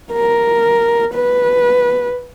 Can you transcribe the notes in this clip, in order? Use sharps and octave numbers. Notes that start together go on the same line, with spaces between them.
A#4
B4